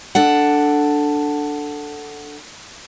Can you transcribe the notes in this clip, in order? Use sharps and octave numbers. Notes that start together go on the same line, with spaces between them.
D4 A4 F#5